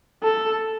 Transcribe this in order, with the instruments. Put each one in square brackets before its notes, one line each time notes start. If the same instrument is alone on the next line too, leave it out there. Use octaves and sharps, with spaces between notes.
[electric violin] A4